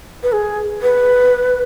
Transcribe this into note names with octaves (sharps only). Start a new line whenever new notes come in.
B4
G#4
B4